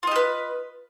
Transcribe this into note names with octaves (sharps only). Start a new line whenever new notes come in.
F4 G4 B4 D#5